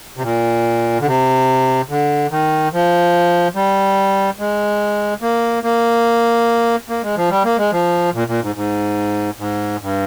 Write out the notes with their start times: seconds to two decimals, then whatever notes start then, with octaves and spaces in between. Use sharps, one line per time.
0.17 C3
0.23 A#2
1.01 D3
1.06 C3
1.89 D3
2.31 D#3
2.73 F3
3.55 G3
4.39 G#3
5.22 A#3
5.64 A#3
6.90 A#3
7.03 G#3
7.17 F3
7.31 G3
7.44 A#3
7.58 G#3
7.72 F3
8.14 A#2
8.28 A#2
8.42 G#2
8.56 G#2
9.39 G#2
9.81 G2